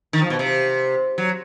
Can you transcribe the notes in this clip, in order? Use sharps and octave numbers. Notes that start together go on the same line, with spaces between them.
D#3
F3
B2
C3
F#3